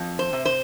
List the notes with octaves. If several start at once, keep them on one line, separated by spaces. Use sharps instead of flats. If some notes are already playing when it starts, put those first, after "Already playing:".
Already playing: F2
C5
C3
C5